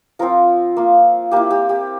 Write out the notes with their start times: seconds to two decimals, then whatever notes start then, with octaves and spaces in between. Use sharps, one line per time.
0.19 F3 C4 F4 A#4
0.77 A#3 F4
1.31 A#3 E4 G4
1.50 G4
1.69 G4